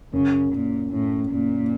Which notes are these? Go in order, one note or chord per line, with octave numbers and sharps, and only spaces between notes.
F#2 C#3
F#2 A#2
A2 C#4
F#2 A#2